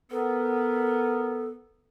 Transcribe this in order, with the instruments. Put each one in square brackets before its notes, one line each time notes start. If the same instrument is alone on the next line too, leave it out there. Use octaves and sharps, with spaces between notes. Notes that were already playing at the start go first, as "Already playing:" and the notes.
[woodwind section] B3 [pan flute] A4 [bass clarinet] A#4